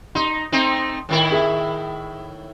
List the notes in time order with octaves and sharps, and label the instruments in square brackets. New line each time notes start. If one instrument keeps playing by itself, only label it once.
[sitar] D#4 [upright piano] C6
[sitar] A3 C4 D#4
A2 D#3 E4
[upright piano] G#4 E5